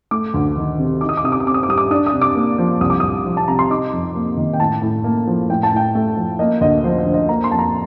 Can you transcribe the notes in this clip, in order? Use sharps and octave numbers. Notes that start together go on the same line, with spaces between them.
A3 D6
D2
D#3
C3
D#4 D6
D#6
D6
C3 D#6
D6
D#6
C4 D6
D#6
D6
G3 D#6
D6
D4 D#6
D#6
C3
D6
A#3
F3
C2 D#6
D6
C2 D#6
F3
A5
C3 A#5
C6
D#4 D6
F2
A#3
D#3
G5
A2 A5
A2
A#3
F3
A2 G5
A5
A2 G5
A3
F3
A#3 D#5
D2 D#5
F3 C5
C5
D3
D#5
A#3 A#5
C6
F2 A5
A#5